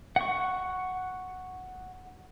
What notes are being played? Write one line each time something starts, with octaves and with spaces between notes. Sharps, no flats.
F#5 C#6